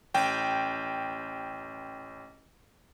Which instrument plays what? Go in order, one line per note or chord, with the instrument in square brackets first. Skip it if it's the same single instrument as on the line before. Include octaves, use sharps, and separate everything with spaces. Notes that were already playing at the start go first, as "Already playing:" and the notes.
[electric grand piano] A1 G5